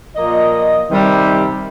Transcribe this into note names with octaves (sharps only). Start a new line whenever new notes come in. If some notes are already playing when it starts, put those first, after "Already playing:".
A#2 F3 A#3 D#5
C3 D#3 G3